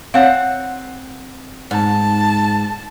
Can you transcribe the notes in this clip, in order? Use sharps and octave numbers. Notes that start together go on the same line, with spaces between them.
C4 C#5 F5 F#5
G#2 A5